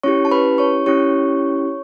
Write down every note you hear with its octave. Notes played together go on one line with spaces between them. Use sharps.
C#4 E4 G4 C#5 C#6
A5
B4 B5
C#5 C#6
C#4 E4 G4 C#5 C#6